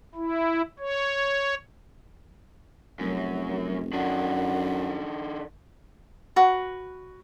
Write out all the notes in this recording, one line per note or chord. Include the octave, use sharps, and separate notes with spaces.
E4
C#5
F1 F#2 F#3
F#2 D#3 D4 F#5
F#4 B4